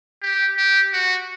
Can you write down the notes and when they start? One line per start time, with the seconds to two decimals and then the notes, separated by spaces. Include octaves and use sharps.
0.22 G4
0.58 G4
0.93 F#4